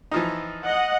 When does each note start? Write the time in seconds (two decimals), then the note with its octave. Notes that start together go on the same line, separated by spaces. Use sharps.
0.11 E3 F3 D#4
0.65 D#5 F#5